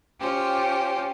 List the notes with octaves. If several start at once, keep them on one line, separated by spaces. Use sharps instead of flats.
C#4 F4 G4 C5